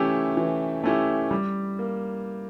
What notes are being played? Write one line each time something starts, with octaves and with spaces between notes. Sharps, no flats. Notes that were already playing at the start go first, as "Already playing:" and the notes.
Already playing: E3 A3 C#4 E4 G4
E3
A3 C#4 E4 G4
G3
A#3